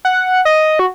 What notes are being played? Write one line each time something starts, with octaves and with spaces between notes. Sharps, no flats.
F#5
D#5
F#4